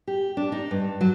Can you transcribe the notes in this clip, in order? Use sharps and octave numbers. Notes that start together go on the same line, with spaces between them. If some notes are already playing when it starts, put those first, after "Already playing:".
G4
D4
D#4
G2
F#3